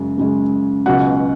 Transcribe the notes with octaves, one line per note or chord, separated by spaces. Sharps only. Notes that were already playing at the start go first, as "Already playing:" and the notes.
Already playing: F#2 C#3 G#3
F#2 C#3 G#3
C#2 B2 F#3 F#5